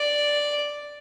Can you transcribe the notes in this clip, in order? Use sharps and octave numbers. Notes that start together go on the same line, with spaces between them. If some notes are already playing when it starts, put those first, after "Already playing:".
Already playing: D5